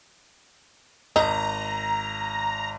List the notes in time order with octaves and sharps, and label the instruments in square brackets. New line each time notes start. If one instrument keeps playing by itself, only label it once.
[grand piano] G#1 [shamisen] D#4 [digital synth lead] A#5